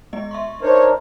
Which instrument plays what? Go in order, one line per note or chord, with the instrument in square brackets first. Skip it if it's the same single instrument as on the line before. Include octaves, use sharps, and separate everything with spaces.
[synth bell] G#3 B3 D#5
E5 C6 C#6
[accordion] D4 D#4 A#4 [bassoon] C5 [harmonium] C#5